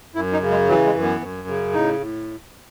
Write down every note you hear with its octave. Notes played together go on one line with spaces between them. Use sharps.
F#2 E4
D#4
C#3
G#3
E3 F#3
G#3
F#2
B3
F#2
C#3
A2 D#4
A2